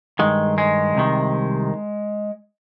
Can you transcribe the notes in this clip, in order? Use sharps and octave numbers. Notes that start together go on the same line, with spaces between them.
G2 D#3 G#3
G#3
C2 C3 D#3